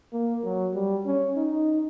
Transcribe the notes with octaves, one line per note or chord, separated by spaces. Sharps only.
A#3
F#3
G3
C#4
D#4